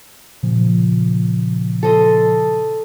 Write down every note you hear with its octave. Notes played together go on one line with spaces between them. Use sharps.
A#2 C#3 F3
A4 D#5 C6